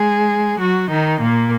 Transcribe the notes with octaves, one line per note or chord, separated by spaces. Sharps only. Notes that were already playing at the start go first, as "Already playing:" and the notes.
Already playing: G#3 G#4
F#3 F#4
D#3 D#4
A#2 A#3